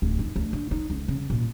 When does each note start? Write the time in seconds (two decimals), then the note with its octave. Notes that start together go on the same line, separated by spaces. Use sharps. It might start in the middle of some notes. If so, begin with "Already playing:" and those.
0.02 D1
0.19 D#3
0.36 D2
0.53 D3
0.71 D#4
0.90 C#2
1.08 C#3
1.30 A#2